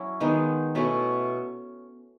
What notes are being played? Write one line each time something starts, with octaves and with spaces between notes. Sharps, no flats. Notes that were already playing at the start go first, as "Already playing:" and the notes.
Already playing: F#3 C#4 E4
D#3 G#3 B3 D#4
B2 A3 C#4 E4